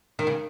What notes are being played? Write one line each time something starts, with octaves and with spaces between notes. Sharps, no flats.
D#3
C#3